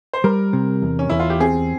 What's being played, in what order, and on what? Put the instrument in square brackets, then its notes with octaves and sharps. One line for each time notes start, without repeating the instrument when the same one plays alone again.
[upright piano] C5
[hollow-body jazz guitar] G3 [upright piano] A#4
[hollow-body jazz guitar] C3
E2
[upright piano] C#4
[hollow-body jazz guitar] E2 [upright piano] E4
[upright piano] F4
G4
[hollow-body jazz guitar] C4 [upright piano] G#4